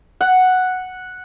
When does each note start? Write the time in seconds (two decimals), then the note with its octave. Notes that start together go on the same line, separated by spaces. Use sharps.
0.21 F#5